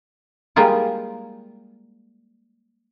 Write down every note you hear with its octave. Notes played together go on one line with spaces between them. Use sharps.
G3 G#3 A#3 D#4 F4 D5